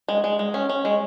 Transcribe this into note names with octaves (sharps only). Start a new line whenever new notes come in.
G#3
G#3
G#3
C#4
C#4
G#3